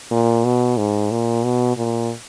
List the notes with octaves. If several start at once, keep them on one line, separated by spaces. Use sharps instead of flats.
A#2
B2
G#2
A#2
B2
A#2